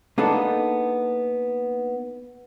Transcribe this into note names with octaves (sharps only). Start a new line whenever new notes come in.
A#3 B3 D4 D#4 G#4 A4